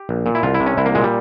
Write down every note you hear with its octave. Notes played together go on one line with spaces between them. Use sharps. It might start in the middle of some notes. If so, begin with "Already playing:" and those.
Already playing: G4
A#1
A#2
E4
C2 F4
E4
C3
C#4
C2 E4
A#3
A#2 G#3
G3